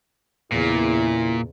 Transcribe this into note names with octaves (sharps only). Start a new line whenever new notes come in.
E2 A#2 C#3 E4